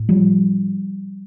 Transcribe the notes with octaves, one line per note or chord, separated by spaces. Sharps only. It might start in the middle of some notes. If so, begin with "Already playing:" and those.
Already playing: A2
F3 G3